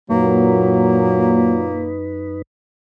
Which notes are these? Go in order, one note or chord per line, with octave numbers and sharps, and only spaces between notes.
F#2 A#2 F#3 A#3 D#4 B4